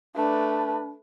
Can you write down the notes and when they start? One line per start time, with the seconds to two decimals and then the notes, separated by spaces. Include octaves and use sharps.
0.16 A3 D4 B4